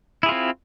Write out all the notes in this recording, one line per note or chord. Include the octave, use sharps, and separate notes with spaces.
C4 E4 F4 G#4